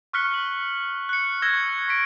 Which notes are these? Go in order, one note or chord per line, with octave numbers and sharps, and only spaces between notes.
C#6 F6 F#6 B6 C#7 G7
F#7
F#6 C#7
C#6 E6 G#6 A#6 E7 G7
C#6 B6 D7